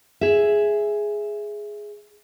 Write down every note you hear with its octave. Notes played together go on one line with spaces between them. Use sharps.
G#4 E5